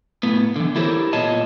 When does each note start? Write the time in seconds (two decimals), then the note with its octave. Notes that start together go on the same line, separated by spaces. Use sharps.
0.23 A2 B3
0.56 D3 E3
0.76 E4 G4 A4 A#4 C5 C#5
1.13 A#2 B3 F4 C#5 D#5 A5